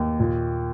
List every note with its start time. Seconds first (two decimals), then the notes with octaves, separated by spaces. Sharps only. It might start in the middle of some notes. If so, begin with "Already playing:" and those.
Already playing: D#2
0.20 A#2